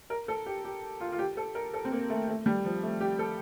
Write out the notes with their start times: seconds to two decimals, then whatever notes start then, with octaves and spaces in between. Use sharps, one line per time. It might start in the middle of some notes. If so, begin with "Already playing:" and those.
0.10 A#4
0.28 A4
0.46 G4
0.64 G4
1.00 F4
1.12 F4
1.19 G4
1.37 A4
1.55 A#4
1.74 A4
1.85 C4
1.92 A#3
2.10 A3
2.28 A3
2.46 G3
2.65 F3
2.83 A3
3.01 G4
3.19 A4